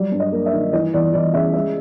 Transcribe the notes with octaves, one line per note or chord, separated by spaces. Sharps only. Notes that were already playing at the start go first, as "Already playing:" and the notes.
Already playing: F#3 G3 D5
G2
D#5
A#3
E5
D#3
E3 D#5
E2 D5
E2 D5
C#3 E5
G#3 E5